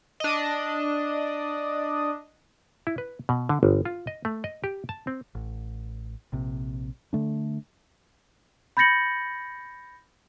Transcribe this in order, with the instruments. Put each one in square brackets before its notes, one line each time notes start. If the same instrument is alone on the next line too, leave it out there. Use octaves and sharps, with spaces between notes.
[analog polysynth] D4 D#5
[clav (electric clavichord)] E4
B4
B2
D3
G1
F4
D#5
A3
D#5
G4
A5
C4
[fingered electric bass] A1
A#1 C3
D3 A3 D4
[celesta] B5 G6 A6 A#6 C#7 F#7